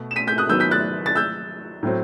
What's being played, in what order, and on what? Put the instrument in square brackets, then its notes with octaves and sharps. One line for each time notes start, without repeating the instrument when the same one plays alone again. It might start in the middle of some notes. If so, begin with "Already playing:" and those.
Already playing: [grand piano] B2 A3
[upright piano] E7
B6 D#7
G6 B6
D#6 F#6
[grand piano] D#3 F#3 B3 [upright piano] E6 G6
[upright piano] G6 B6
F#6 A6
A6
E6 G6
[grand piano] A2 F#3 C4